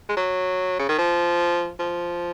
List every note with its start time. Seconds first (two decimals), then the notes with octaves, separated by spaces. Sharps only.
0.09 G#3
0.17 F#3
0.79 C#3
0.89 D#3
0.98 F3
1.79 F3